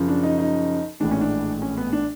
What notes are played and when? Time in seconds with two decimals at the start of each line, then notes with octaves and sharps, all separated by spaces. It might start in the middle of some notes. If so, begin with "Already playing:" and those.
Already playing: F#2 C#3 F3
0.08 D4
0.23 D#4
0.39 D#4
1.00 A#1 A2 E3 G#3 D4
1.11 C#4
1.21 D4
1.62 C#4
1.77 B3
1.93 D4